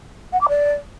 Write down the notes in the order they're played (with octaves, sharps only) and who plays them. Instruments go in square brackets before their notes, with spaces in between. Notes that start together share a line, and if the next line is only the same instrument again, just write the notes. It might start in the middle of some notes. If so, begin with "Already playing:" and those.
[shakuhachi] F#5
D6
D5